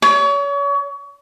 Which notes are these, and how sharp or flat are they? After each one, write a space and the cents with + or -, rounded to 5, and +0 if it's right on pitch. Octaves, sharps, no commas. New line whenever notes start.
C#5 +35